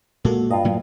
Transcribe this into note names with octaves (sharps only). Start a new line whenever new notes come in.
A#2 G#3 A#3 F#4 A4
G2 F4 D#5
A2 F#3 A#3